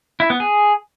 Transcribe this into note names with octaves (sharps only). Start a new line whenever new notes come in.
E4
B3
G#4